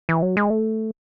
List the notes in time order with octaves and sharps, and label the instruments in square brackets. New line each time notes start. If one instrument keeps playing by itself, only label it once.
[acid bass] E3
F#3
G#3
A3